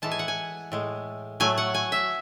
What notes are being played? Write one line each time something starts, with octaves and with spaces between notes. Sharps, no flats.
A2 E3 G#3 A5
G#5
F#5
G#5
A2 G#3
A2 F#3 A3 G#5
F#5
G#5
E5